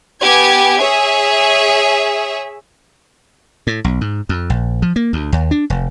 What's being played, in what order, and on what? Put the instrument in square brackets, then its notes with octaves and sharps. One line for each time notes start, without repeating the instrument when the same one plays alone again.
[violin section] B3 G4 G#5 G#6
G#4 C#5 E5
[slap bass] A2
B1
G#2
F2
A#1
F3
A#3
D2
D#2
D4
F1